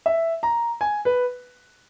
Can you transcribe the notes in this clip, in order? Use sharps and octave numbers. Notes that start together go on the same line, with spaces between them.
E5
A#5
G#5
B4